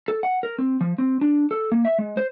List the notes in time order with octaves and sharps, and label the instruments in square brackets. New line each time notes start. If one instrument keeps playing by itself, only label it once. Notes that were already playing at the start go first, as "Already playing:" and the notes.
[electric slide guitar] A4
F#5
A#4
C4
F3
C4
D4
A4
A#3
E5
G#3
C5